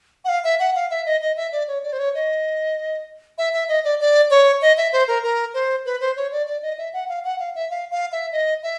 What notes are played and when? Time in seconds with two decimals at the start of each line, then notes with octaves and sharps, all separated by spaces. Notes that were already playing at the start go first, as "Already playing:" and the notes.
0.25 F#5
0.29 F5
0.44 E5
0.60 F#5
0.75 F5
0.91 E5
1.06 D#5
1.22 D#5
1.37 E5
1.52 D5
1.68 C#5
1.83 D5
1.93 C5
1.99 C#5
2.15 D#5
3.38 E5
3.53 E5
3.69 D#5
3.85 D5
4.00 D5
4.30 C#5
4.62 D#5
4.77 E5
4.93 C5
5.08 A#4
5.23 A#4
5.54 C5
5.86 B4
6.01 C5
6.17 C#5
6.32 D5
6.47 D5
6.62 D#5
6.78 E5
6.93 F#5
7.09 F5
7.25 F#5
7.39 F5
7.55 E5
7.70 F5
7.91 F5
8.12 E5
8.32 D#5
8.63 E5